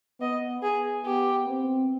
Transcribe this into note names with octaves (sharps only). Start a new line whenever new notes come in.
B3 D#5
G#4
B3 G4
C4